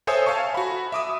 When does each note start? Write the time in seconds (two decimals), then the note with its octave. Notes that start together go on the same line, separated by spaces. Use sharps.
0.07 A4 C5 C#5 E5 G#5 D#6
0.26 E5 F5 G#5 A5 C#6
0.54 F#4 B5
0.92 E5 D6 D#6